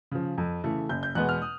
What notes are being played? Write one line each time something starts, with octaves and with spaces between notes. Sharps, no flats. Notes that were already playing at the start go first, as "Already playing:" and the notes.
C#3 F3
F2
C#3 E3 A3
F#1 G6
G6
E2 B2 G#3 B3 F#6
F6
D#6